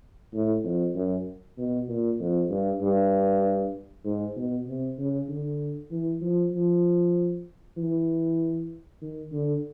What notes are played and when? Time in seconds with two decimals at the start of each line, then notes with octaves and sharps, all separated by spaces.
0.34 A2
0.64 F2
0.95 F#2
1.58 B2
1.88 A#2
2.20 F2
2.50 G2
2.81 G2
4.05 G#2
4.36 B2
4.67 C3
4.99 C#3
5.29 D3
5.91 E3
6.21 F3
6.53 F3
7.77 E3
9.01 D#3
9.32 D3